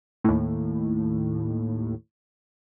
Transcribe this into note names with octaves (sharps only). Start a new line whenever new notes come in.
D#2 A2